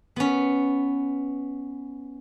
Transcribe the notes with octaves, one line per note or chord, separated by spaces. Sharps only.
B3 C#4